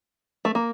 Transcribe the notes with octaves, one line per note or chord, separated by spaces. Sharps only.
A3
A#3